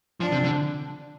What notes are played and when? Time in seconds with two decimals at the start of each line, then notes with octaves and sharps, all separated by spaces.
0.20 F3 D4
0.32 C3
0.44 D3